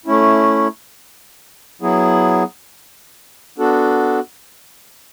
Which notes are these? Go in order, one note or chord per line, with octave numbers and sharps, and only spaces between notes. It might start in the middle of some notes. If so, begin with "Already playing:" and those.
A3 C#4 E4
F#3 B3 E4 G#4
B3 D4 F#4 A4